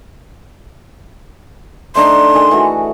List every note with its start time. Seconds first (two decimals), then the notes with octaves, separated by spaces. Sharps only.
1.95 A3 D4 D#4 C6
2.34 D#3 G#4
2.51 E3 A3 F#4